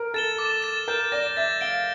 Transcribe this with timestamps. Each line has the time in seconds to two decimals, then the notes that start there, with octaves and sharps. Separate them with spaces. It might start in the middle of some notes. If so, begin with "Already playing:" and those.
Already playing: A#4
0.14 A4 A6 E7 G7
0.38 D6
0.62 A6 E7
0.88 A#4 G6
1.12 D5 A#6 E7
1.37 E5 A6
1.61 F5 D7 G7